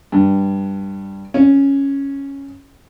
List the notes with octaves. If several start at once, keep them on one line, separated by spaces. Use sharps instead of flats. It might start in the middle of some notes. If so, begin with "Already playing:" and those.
G2
C#4